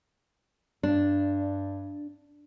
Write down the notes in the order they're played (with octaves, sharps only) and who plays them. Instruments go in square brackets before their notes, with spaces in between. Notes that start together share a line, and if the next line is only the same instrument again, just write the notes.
[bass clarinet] G2 [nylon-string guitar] D4